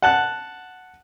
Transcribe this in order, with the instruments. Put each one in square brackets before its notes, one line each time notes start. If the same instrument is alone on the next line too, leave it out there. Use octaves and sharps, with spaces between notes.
[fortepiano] F#5 A5 F#6